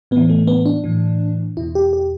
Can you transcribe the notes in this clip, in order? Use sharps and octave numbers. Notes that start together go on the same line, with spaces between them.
A2 E3 B3
A3
B3
D4
A2 E3
E2 B2 E4
G4
G4